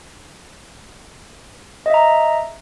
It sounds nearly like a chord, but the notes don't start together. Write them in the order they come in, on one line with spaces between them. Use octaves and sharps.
D#5 E5 A#5